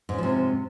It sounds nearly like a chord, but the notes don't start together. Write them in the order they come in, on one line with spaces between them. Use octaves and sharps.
G#2 C#4 F3 C3